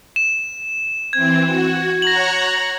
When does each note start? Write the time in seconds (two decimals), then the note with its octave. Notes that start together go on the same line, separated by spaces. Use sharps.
0.16 E7
1.13 E3 C4 G#6
1.45 F#4
2.02 C#5 F#5 A#5 A#6 F#7